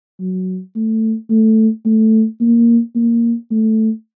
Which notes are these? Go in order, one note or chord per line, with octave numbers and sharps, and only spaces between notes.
F#3
A3
A3
A3
A#3
A#3
A3